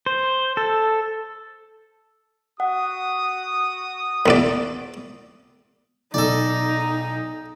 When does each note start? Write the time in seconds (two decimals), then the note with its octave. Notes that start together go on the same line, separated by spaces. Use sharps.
0.06 C5
0.57 A4
2.60 F#4 F#5 D#6
4.26 B1 E2 D5
6.14 B1 D#4 A4 D5